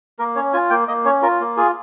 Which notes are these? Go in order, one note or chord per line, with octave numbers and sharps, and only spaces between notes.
A#3 A#4
C#4 C#5
F4 G#5
A#3 G5
A#3 D#5
C#4 C#5
F4 A#4
A#3
F4 G#4